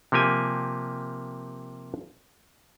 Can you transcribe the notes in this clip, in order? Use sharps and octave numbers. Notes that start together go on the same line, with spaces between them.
C3 F3 A#3 G4 G#5